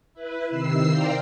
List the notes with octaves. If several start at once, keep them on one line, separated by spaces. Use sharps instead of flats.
E4 B4
C3 D#3 E6 C7
A#4 C5 D5 F5 G5 A#5